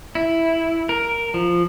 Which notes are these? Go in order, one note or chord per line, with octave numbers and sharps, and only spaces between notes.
E4
A#4
F3